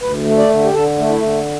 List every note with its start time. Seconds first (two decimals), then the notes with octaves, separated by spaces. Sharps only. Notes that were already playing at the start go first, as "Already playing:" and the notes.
0.01 D2 B4
0.26 A3
0.38 D5
0.49 D3
0.64 G4
0.73 D3 A4
0.98 A3
1.09 E4
1.22 D3